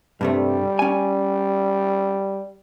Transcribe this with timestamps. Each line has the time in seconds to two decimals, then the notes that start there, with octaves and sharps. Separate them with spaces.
0.21 G2 C3 G3 A3
0.79 C#4 G#5